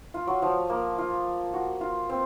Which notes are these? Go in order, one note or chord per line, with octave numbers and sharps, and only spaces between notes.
F4
F#3
F3
A#3
F4
F#4
F4
C4